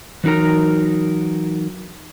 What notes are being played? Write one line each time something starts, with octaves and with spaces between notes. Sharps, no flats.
E3 F#3 D#4 A#4 A#5